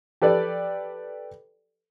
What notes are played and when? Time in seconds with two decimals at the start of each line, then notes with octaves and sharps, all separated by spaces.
0.22 G4 A4 B4 D5